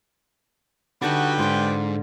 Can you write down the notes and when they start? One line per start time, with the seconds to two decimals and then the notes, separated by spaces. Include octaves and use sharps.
1.02 D3 G3 D#4 F#4 B4 G5 A5
1.38 G#2 F4 D5